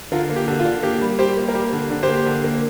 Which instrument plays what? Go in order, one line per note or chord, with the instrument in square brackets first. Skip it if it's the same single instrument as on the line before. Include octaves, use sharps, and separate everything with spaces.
[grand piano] D3 F4 A#4
A#3
G4
D3
F4
D3
A#3 G4
G3
G3 G4 C5
A#3
A#4
A#3 G4
D3
D3
G4 C5
A#3
D3
A#3